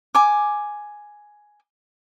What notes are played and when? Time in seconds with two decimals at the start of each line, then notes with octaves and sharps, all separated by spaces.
0.15 G#5 D6